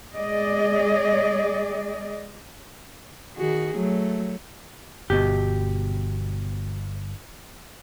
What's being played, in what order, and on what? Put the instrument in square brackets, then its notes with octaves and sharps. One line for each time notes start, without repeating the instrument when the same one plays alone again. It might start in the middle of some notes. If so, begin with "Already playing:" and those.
[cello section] G#3 G#4 D5 D#5
[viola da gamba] D#3 F#4 G#4
F#3 A3
[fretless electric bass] G1 [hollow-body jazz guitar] B2 G4